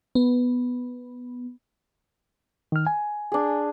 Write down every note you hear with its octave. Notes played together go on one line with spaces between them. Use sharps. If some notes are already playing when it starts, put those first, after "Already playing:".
B3
D#3 F6
G#5
D4 G#4